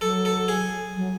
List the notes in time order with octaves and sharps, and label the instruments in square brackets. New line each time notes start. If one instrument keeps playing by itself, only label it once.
[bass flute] F#3 [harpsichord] A4
[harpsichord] A4
G#4
[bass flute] F#3